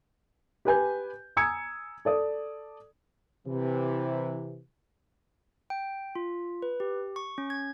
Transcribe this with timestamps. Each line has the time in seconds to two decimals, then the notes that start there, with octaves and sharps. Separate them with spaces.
0.65 G4 B4 G#5 G6
1.37 G#5 A#5 D#6 E6 G#6 C#7
2.05 A4 D5 D#6
3.47 C3 E3
5.70 G5
6.15 F4
6.62 B4
6.80 G4
7.16 C#6
7.38 C#4
7.50 G#6